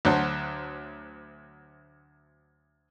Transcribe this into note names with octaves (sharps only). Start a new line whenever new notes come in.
D2 D3 F#3 C5 F#5 A5